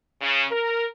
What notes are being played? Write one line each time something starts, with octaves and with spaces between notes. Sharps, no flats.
C#3
A#4